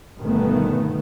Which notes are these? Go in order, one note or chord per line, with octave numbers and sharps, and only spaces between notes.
G1 G2 B2 D#3 A3 B3